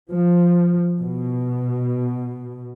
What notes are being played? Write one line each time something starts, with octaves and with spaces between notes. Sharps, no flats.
F3
B2